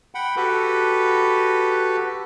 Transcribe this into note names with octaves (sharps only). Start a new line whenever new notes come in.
F#5 G5 B5
F#4 G4 A4 B4